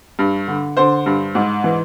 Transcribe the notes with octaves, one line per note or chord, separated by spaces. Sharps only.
G2
D3
D3 C5
G2
G#2
E3